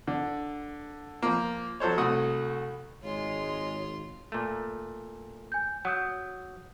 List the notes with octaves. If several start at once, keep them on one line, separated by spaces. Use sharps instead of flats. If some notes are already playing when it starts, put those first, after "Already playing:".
D3
F3 A#3
F3 F#3 A4 C5 C#5
C2 A3 F#4 D#6
G#1 G#3 F4 C#5 C6
A#2 A3
G#5 G6
F#3 F#5 D#6 G6